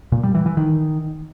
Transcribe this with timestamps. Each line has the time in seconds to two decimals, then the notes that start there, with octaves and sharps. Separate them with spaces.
0.12 A#2
0.23 G3
0.35 E3
0.46 E3
0.57 D#3